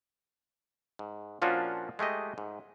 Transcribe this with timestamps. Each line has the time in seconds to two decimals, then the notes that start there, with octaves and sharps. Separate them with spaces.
0.99 G#2
1.42 A#2 F3 C#4 D4 F4 F#4
1.99 G#3 A3 G4 D#5
2.38 G#2